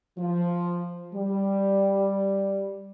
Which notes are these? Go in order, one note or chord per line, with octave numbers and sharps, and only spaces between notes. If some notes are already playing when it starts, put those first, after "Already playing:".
F3
G3